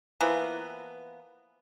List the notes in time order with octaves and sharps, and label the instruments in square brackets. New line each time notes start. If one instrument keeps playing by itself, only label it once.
[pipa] E3 F3 A#3 B3